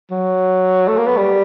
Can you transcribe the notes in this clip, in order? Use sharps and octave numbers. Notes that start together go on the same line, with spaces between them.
F#3
A3
A#3
B3
G3